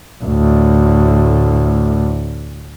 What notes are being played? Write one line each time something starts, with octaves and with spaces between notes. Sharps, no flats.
D2 A2